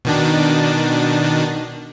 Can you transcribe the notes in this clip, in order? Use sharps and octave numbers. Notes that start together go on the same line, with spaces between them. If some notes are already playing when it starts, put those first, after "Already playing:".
B2 D#3 D4